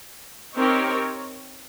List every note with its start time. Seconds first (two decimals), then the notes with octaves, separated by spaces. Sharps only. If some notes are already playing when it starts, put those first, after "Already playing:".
0.56 C4 D#4 G4 A#4 C#5